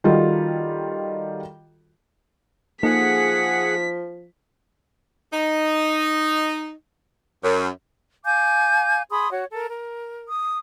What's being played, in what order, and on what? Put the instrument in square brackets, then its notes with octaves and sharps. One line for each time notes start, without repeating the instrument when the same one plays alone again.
[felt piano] D#3 G3 F4 F#4 A4
[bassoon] F3 [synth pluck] A#3 D#4 A4 [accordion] G#4 F#5 [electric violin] B6
[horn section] D#4
F#2
[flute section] F5 G#5 D6 G6
G#4 B5 C6 D#6
F#4 C#5
A4 A#4
A#4
D#6